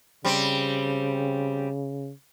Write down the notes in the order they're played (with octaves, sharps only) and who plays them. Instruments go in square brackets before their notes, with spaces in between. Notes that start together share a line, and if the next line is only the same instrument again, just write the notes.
[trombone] C#3 [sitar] G3 C4